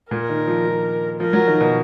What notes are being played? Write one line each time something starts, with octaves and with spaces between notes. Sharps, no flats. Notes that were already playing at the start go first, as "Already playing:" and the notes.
A#2 A#4
D#3
F3
F3
F3 A#4
F#3
D#3
B2